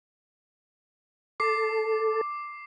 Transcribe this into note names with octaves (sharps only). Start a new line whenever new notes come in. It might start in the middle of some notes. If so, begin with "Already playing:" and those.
A4 D6 C7